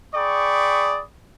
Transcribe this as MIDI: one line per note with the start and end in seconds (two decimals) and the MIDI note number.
0.15 1.02 68
0.15 1.02 74
0.15 1.02 79
0.15 1.02 83
0.15 1.02 85
0.15 1.02 87